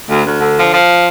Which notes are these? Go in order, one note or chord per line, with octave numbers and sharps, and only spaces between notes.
D2
D2
D3
F3
F3